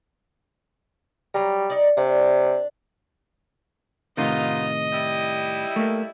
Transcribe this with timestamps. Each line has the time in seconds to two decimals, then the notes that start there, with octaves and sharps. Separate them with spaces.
1.34 F#3 G3 A#5
1.70 D#4 D5
1.97 C3 D4
4.17 A2 C3 D#3 B3 D#4 F4 D#5
4.92 G3 E4
5.76 A3 A#3